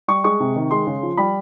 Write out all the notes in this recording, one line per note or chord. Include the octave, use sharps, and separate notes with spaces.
G3 C#6
G#3 C#6
C3
D#3
G#3 C6
C#3
F3
G3 B5